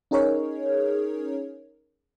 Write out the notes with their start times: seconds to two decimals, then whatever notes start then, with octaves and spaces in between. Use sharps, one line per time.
0.11 C#4 D#4 G#4 A#4 C#5